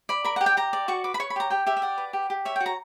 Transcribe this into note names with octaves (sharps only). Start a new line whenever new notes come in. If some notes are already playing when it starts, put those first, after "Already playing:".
D5 B5
A#4 B5
F#5
G4
G5
G4 A#5
D5
F#4 C#6
B4 D6
B5
C#5 C#6
B5
G4 A#5
G4 G5
G4 E5
E5
D5 F#5
B4
G4
G4
C#5 E5
G5
F#4
A#5